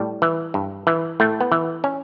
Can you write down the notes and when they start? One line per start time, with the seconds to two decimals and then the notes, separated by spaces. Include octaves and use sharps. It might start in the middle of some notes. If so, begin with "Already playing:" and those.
Already playing: A2 G3
0.22 E3
0.54 G2
0.87 E3
1.20 A2 A3
1.41 B3
1.52 E3
1.84 C#4